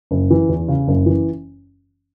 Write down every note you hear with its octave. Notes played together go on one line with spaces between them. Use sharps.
F#1
E3
E2
C#3
F#1
E3